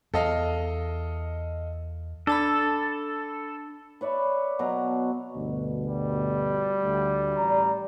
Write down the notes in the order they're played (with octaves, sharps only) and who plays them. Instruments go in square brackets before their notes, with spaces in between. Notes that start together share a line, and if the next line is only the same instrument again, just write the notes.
[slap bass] E2 [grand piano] A4 D#5 F5
[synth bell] D4 A5 B5 [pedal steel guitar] A4
[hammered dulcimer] B4 C#5 D5 E5
B2 F#3 A#5
[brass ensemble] D2 G2 B2
[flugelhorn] G3
[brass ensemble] D2
A1 D5 A#5